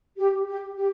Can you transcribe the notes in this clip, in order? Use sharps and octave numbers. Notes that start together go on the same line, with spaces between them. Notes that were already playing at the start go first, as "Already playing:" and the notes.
G4
G4
G4